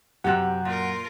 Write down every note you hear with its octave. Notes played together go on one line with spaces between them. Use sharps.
F#2 C3 G4 F#5 F#6
A#2 F4 A#4